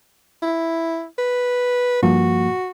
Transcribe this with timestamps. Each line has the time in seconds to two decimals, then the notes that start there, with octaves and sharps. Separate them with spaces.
0.42 E4
1.18 B4
2.03 G2 F3 A#3 F#4